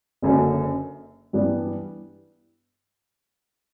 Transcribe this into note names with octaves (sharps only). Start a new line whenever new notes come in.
F#1 F#2 D3
G2 E3 G3 B3 D4